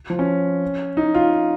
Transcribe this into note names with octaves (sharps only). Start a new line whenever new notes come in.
F3
C#4
D#4
F4